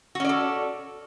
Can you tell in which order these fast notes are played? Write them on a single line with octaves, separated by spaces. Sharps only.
F#4 C#4 D5 A4